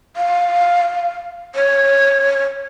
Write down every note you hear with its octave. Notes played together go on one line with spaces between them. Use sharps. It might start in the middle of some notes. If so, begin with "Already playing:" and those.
F5
C#5